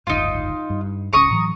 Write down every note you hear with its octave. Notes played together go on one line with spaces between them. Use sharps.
F#1 D2 G#2 D#4 F4
G2
D1 C#2 C#4 A#5 C#6 D#6
A2 E3 F#3